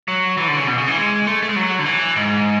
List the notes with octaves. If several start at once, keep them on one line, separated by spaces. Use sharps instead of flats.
F#3
E3
D3
C#3
B2
C#3
E3
G#3
A3
A3
G#3
F#3
D3
E3
G#2